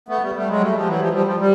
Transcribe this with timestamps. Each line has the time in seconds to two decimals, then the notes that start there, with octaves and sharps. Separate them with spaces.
0.08 A3 B3
0.22 G3 A3
0.35 G3 A3
0.49 F#3 G#3
0.60 G3 A3
0.74 F3 G3
0.87 E3 F#3
1.00 F3 G3
1.13 F3 G3
1.26 F3 G3
1.40 G3